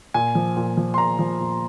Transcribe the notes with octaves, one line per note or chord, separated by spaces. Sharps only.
A#2 G#5
F3
A#2
F3
C6
A#2 A#5
F3
A#2